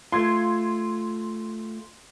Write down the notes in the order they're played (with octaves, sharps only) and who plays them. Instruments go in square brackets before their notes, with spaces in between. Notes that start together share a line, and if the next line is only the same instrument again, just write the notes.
[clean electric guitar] A3 F4 [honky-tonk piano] C6 G#6